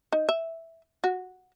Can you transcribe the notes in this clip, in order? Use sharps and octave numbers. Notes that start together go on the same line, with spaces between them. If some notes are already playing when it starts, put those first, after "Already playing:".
D#4
E5
F#4